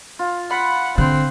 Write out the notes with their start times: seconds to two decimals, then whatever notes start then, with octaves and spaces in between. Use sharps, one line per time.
0.19 F4
0.51 F#5 B5
0.98 D3 C4 F#5